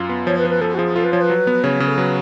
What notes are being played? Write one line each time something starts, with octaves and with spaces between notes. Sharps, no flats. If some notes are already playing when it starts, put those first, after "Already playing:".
Already playing: F#2 F4
B3
F3 C#5
B4
F3
B4
F3 A4
F#4
F3 G#4
F4 A4
B4
F3 C#5
B4
F#3
B3
C#3 C#5
C#3
A4
F#3 B4